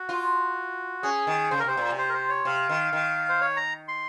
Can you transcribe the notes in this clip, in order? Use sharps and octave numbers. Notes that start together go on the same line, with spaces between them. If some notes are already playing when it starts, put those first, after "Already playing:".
Already playing: F#4
F4
C#4 G#4
D#3
C#3 C5
A#4
C3 C5
A#2
C3
C5
A#4
C5
C#5
C3 F5
D#3
D#3
C5
C#5
A#5
C6